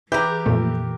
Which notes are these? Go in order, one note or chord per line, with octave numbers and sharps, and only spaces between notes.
E3 G4 G#4 A#4 B4 E5 G6
F2 A#2 A3